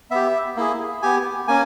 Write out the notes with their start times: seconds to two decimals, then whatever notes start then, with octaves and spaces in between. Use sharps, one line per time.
0.11 B3 G4 E5
0.57 A#3 E4 G#4
1.02 B3 G4 G#5
1.47 A#3 C#4 G#5